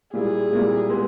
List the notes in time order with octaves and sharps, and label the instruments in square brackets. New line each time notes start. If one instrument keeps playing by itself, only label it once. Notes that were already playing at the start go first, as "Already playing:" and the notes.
[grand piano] A#2 G3 A#3 E4 [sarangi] G#4
[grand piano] A#2 G3 A#3 E4
G#3 B3 G4